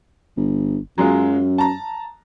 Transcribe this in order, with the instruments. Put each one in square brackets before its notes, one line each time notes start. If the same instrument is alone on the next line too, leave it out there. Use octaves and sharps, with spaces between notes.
[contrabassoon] G1
[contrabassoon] F#2 [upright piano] F#3 G#3 F4
[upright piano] A5 A#5